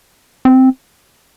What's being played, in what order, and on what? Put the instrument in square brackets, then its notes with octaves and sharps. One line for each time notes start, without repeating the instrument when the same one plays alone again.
[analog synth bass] C4